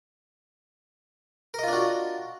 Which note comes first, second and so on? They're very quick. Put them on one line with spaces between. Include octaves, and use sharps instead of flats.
A#4 D#5 F4 D4 F#4